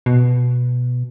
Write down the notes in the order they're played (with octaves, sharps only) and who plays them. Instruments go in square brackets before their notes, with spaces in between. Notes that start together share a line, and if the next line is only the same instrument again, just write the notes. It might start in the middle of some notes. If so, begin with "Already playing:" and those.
[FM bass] B2